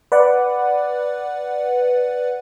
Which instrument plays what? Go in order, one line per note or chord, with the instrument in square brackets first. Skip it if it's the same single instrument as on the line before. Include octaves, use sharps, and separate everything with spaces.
[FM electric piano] B4 D5 F#5